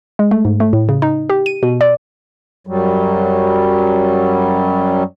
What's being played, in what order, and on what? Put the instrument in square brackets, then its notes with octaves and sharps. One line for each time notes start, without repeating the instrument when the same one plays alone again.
[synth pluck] G#3
A3
G#2
A3
A2
C#3
D#4
G4
D#7
B2
D5
[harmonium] F#2 F#3 G3